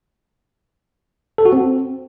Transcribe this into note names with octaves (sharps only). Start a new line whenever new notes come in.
A4
F#4
C4